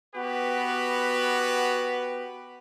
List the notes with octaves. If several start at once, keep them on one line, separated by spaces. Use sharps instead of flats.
B3 F#4 G4 B4